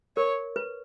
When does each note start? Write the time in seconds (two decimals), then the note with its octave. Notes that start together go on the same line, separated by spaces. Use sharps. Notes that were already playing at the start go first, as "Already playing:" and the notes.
0.17 A#4 C#5
0.56 B4